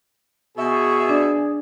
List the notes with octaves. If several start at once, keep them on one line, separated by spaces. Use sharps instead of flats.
B2 G#4 E5 C#6
D4 D5